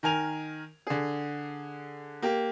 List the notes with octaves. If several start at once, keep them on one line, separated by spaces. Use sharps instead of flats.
D#3 A#4 G#5 F7
D3 G#4
A#3 G4